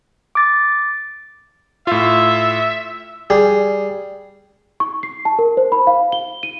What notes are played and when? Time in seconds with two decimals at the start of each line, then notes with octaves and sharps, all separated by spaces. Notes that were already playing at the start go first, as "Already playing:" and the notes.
0.35 D6 A6
1.87 A2 F4 E5
3.30 G3 G#4
4.80 C#6
5.03 C7
5.25 A5
5.39 A#4
5.57 C5
5.72 B5
5.87 F5
6.12 G7
6.43 D#7